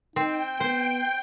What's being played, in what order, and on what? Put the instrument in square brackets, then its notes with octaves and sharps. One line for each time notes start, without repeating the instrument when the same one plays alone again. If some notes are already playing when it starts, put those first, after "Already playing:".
[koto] C4 [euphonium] D#4 [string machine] G5
[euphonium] B3 [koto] C5